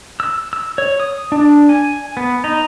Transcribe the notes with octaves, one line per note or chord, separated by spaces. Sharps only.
E6
E6
C#5
D#6
D4
G#5
B3
D#4